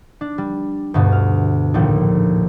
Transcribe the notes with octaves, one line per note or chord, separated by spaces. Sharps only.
D4
G3
D2 G2 B2
F6
A#1 D#2 A2 F3